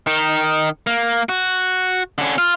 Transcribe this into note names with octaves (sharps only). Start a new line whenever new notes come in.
D#3 D#4
A#3
F#4
D3 C#4
F4